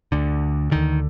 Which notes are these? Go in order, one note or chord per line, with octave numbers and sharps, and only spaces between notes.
D2 D3
D2 D3 D#3